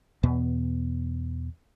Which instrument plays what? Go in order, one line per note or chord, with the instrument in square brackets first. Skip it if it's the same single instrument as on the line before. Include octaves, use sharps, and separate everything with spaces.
[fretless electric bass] E2 B2 B3